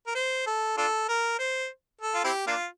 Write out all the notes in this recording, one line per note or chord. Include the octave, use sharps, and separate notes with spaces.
A#4
C5
A4
D4 F4 A4
A#4
C5
A4
F4
C4 E4 G4
A#3 D4 F4